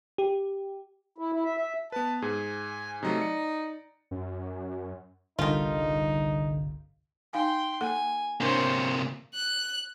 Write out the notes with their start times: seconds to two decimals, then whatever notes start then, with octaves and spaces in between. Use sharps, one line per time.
0.18 G4
1.18 E4
1.33 E4
1.44 E5
1.57 E5
1.92 B3 B4 A5
2.22 G#2 G#4 G#5
3.03 C3 F#3 A3 D#4
3.20 D5 C#7
4.11 F#2
5.39 G1 C2 D3 D#3 G3 D#4 F4
7.33 D#4 F5 G5 G#5 C6
7.81 A#3 A4 F#5 G#5
8.41 C3 A#3 D4 A#4 C5 C#5
9.34 F#6